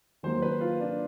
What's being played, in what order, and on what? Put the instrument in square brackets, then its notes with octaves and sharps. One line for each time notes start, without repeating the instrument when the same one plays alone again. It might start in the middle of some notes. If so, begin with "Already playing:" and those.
[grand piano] D#3 F#3 A#3 [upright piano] C5
[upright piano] B4
F4
D4